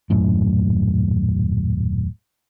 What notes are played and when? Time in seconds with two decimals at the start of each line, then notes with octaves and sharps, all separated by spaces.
0.10 D#1 F#2 A2